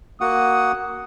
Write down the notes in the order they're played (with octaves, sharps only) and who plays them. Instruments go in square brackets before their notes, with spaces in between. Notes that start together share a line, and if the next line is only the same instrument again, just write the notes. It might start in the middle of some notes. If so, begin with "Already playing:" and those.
[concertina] A#3 F#4 F#5 [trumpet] D#6